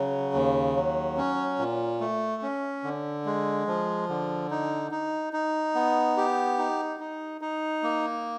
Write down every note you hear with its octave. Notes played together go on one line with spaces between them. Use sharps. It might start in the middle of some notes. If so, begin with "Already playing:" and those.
Already playing: C#3 F#3
D#2
F#3
C#4
A#2
A3
C#4
D3
G#3
F3
D3
D#4
D#4
D#4
B3
G4
D#4
D#4
D#4
A#3